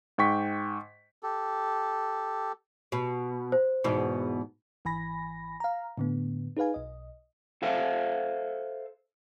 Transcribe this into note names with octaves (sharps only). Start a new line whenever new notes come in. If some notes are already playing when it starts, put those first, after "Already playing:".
G#2 G5 C#6 B6
G4 A4
B2
C5
E2 G#2 B2
G#1 E3 G#5 B5 A#6
F5 A#5
A2 D3 B3
D#4 G#4 B4 F5 G#5
B1 D#5
A4 C5 E5 F5